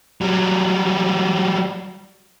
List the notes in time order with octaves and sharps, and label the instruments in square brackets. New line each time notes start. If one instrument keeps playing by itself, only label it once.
[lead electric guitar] F#3 G3